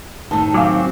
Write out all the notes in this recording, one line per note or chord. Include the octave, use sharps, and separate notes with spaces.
A2 D#3 A5
F#3 C4 F5 G#5 D6